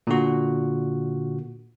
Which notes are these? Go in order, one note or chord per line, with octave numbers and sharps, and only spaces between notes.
A#2 D3 F#4